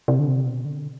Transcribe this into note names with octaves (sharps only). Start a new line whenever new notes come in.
C3
D3
C3
B2
D3